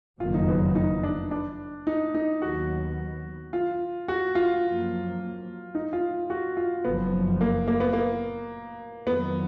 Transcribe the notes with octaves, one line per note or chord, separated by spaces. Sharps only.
F#1 F2 D#3 F#3 A#3 F4
D#4
B3
D#4
D4
D4
D#4
D#4
D#2 D#3 F#3 B3 F#4
F4
F#4
F4
F#2 F3 A#3
D#4
F4
F#4
F4
F#1 F#2 F3 B3
A#3
A#3
B3
A#3
F2 D#3 F#3 A#3 B3